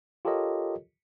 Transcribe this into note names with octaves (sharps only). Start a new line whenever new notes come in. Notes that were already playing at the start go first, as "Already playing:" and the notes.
F4 G4 A4 A#4 C#5 D#5